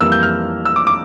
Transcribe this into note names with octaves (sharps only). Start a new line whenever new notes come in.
F2 E3 G3 A#3 E6
G6
F6
E6
D6
D6